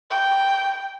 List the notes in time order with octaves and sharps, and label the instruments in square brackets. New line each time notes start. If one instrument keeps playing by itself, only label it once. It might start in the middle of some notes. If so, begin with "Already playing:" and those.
[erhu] G5